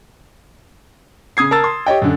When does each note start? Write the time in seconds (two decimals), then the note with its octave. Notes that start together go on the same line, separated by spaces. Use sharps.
1.37 C#3 D#6 G#6 C7
1.51 A#4 A5 E6 A6
1.64 C6
1.86 G4 C#5 D#5 G5
2.02 F#2 D3